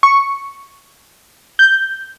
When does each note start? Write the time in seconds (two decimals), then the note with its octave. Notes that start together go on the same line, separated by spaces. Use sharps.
0.03 C#6
1.59 G6